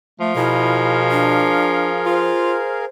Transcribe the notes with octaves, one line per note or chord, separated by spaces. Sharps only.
F3 A3
B2 E4 G#4 A#4 F5
D4
F4 C5